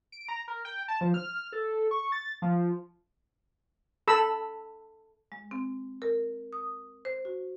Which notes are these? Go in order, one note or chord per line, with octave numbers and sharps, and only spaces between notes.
D7
A#5
A#4
G5
A5
F3
F6
A4
C#6
A6
F3
A4 B5 E6
G#3
C4
A#4
D#6
C5
F#4